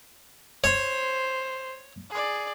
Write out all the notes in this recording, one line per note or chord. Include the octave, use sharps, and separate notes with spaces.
C5 C#5
G#4 D5